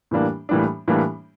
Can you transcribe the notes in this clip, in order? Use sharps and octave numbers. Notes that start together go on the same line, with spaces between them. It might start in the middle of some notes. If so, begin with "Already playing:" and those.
A2 E3 G3 A#3 D4
A2 E3 G3 A#3 D4
A2 E3 G3 A#3 D4